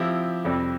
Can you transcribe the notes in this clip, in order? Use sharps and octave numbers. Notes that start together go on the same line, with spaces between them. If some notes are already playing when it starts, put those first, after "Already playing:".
Already playing: F3 C4 E4 G4
F2 C3 G3 C4